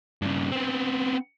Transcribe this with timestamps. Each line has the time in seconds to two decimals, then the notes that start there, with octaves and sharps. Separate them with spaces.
0.22 G2 C#3
0.51 B3 C4